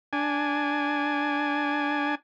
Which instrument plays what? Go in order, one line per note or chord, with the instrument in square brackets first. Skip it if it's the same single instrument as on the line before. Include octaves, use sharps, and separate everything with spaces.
[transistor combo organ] D4 G#5